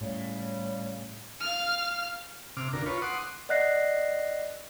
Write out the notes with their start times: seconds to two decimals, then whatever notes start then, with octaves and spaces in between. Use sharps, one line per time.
0.01 A2 C#3 G3
1.40 F5 F6
2.57 C3 D6 F6
2.73 D2 D4 A#4
2.86 F4 B4 C#5
3.02 F#5 C6 D6 D#6
3.49 D5 D#5 F#5 F#6 A#6 C7